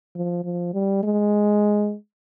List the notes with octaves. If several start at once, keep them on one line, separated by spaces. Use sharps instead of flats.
F3
F3
G3
G#3